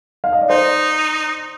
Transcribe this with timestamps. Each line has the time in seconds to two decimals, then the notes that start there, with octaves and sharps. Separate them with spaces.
0.24 F5
0.33 D#5
0.42 D5
0.50 D#4 C5